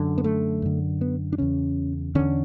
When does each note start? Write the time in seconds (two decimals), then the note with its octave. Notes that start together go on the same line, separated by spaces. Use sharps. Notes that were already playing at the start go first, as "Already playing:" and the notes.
Already playing: F#2 D3
0.18 B3
0.24 A3
0.62 F#2 D3
1.01 B3
1.33 D4
1.38 E2 C#3 C#4
2.15 E2 D3 C#4